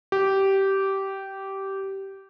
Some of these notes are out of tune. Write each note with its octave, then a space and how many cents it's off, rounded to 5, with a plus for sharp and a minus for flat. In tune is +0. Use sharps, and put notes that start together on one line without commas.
G4 -15